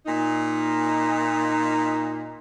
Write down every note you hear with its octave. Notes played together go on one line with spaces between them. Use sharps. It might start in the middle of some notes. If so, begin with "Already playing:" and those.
A#2 D#4